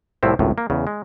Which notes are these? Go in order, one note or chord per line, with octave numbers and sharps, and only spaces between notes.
C2 A2 F3 C4 E4
G#1 C#2 F#2 A2
A#3
E2 C#3
G#3